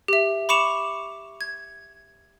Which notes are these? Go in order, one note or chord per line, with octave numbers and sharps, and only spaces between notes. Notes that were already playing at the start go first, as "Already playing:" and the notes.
G4 E5
B5 C#6 D6 C#7 E7 F7
G#6